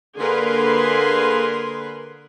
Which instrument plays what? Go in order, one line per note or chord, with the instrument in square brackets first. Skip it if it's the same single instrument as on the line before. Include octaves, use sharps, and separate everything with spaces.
[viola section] D3 A#3 G#4 A#4 B4 C6